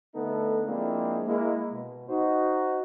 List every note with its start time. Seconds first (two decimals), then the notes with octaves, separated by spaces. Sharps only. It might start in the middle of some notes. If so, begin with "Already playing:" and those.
0.15 D3 A3 B3 D#4 A4
0.67 F3 G#3 A#3 C4 D4 E4
1.27 G#3 A#3 E4
1.72 B2
2.09 D#4 F#4 C5